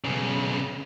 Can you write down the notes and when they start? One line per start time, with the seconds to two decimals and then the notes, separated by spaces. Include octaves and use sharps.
0.05 B1 C#3